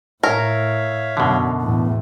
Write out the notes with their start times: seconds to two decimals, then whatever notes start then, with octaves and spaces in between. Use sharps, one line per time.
0.23 A2 A#4 C#5 E5 F5
1.17 F#2 B2 D3
1.61 E2 A2